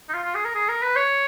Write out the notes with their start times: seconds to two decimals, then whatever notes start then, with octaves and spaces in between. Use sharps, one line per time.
0.09 D#4
0.14 F4
0.24 F4
0.35 G#4
0.45 A#4
0.55 G#4
0.69 A#4
0.82 B4
0.96 C#5